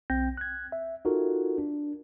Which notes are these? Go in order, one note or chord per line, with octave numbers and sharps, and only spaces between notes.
B1 C4 G5 G6 A#6
F#6 G#6
E5
D#4 F4 F#4 A4 A#4
D4